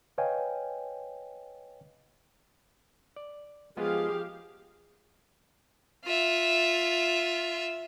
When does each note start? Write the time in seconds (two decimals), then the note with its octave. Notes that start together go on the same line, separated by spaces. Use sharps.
0.18 B4 C#5 D#5 F5 G5 G#5
3.16 D5
3.77 F3 G#3 B3 F4 G4 G#4 F5
6.05 F4 E5